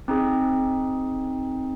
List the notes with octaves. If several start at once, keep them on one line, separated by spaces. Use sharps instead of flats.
C4 D#4 G#4